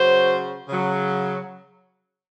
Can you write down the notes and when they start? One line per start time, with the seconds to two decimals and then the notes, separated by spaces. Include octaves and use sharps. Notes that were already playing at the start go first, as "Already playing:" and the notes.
Already playing: C#3 F#3 C5
0.69 C#3 F#3